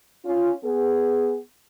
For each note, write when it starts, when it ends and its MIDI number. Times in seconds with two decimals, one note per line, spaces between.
0.24 0.50 61
0.24 0.50 65
0.63 1.37 59
0.63 1.37 68